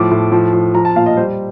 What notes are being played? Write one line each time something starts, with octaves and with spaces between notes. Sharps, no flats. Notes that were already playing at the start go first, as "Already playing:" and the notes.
Already playing: A2 F3 D6
A2
F3
F3
F3 A#5
A5
A#2 F5
D#5
G3 C5